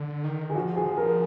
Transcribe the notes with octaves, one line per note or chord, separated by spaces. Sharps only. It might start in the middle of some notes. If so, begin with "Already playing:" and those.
Already playing: D3
D#3
G#4
F3 F#4
G#4
G#4
A#4